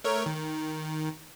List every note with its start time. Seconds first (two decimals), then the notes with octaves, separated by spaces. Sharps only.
0.04 A3 A#4 C#5
0.26 D#3